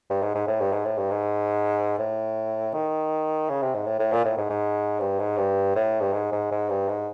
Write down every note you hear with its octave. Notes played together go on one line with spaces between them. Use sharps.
G2
G#2
G#2
A2
G2
G#2
A2
G2
G#2
A2
D#3
C#3
C3
G#2
A2
A2
A#2
A2
G#2
G#2
G2
G#2
G2
A2
G2
G#2
G#2
G#2
G2
G#2